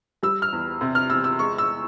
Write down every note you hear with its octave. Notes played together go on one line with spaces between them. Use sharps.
G3 E6
F6
E2
C3
F6
E2 E6
E6
G#3 C#6
E6